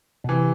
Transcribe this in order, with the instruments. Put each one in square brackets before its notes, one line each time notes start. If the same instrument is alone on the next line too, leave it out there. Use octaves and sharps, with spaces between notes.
[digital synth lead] B2
[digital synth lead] C3 [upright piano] E3